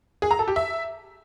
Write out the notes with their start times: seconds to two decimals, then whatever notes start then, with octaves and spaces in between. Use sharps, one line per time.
0.22 G#4
0.31 A#5
0.39 A4
0.48 G4
0.56 E5